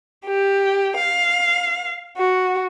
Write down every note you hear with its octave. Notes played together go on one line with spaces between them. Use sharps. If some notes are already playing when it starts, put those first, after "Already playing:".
G4
F5
F#4